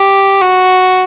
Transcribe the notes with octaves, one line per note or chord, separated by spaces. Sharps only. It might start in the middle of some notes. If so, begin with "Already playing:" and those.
Already playing: G4
F#4